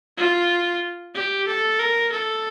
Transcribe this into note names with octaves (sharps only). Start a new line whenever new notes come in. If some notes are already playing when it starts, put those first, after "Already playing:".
F4
G4
A4
A#4
A4